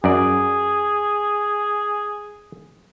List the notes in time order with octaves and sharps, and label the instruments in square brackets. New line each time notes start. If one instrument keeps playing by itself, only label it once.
[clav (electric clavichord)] F#2 D5 [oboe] G#4